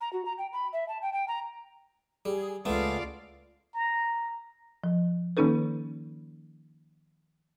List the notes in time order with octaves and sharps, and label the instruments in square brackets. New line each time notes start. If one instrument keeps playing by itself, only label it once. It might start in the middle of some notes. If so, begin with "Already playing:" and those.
[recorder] A#5
F#4
A#5
G5
B5
E5
A5
G5
G5
A#5
[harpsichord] G3 [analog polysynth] G#4
[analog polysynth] C#2 G#3 [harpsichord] A3 B3 [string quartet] F4 D5 F5
[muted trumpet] A#5
[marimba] F3
D#3 A#3 C#4 D#4 A4 B4